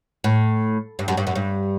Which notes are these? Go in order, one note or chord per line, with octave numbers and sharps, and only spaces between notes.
A2
G2
F#2
G2
F#2
G2